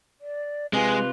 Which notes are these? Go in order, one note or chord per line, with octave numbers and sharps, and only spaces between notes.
D5
C3 G#3 F4 B4 G#5